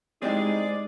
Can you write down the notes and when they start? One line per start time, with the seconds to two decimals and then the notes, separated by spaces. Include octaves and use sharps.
0.23 G#3 C4 D#4 E4 G4 G#4 D5